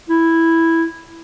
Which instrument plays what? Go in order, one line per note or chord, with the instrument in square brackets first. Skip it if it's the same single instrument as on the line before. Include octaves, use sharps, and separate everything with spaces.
[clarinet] E4